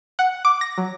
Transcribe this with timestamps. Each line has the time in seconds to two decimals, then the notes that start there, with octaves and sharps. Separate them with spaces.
0.19 F#5
0.45 D6
0.61 A#6
0.78 F#3